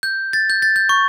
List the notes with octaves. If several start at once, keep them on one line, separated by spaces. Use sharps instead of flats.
G6
A6
G6
A6
G6
C#6